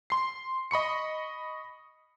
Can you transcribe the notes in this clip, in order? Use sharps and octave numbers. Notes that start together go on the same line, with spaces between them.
C6 C7
D#5 B5 C#6 C#7